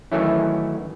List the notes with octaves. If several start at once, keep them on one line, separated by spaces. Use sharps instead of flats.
D#3 E3 F#3 A3 C#4 E4